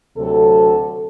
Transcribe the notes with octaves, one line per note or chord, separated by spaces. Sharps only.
D2 C3 F#3 A4